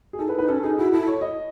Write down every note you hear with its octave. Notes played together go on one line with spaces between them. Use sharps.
G#4
D#4 A4
E4 B4
D#4 B4
C#4 A4
D#4 G#4
E4 F#4
E4 A4
C#5
D#5